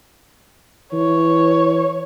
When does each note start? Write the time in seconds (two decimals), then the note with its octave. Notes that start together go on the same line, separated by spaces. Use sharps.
0.93 E3 C#5